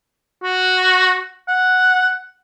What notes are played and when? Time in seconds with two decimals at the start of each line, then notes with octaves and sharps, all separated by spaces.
0.43 F#4
1.48 F#5